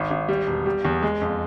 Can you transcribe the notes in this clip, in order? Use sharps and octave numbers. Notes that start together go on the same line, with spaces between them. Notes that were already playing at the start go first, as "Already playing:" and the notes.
Already playing: G#1
G#1
G3
E1
G3
E2
G#3
F2